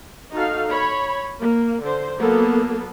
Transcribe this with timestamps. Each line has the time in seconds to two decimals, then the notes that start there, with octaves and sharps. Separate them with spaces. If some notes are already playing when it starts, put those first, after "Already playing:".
0.33 D#4 F#4 A4 F5
0.72 C#5 B5
1.41 A#3
1.84 D3 C5
2.19 F#3 A#3 B3 A4